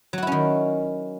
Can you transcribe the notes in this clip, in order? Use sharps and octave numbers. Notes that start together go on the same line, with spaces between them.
D#3 F#3 C#4 E4 F#4